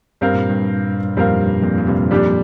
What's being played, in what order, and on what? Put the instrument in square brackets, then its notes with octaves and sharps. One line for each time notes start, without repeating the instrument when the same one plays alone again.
[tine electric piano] G2 [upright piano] G3 C4 A#4 F5
[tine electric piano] A#2
G2
[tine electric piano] F2 A#2 [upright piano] G3 C4 A#4 F5
[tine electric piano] G2
F2 A#2
A#2
G2 C3
[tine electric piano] F2 A#2 [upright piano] G3 D4 G4